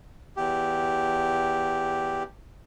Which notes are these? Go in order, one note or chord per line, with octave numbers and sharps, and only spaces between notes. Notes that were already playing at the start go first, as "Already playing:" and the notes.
E2 G4